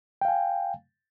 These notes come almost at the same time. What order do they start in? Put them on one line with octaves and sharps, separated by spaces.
G5 F5 G#5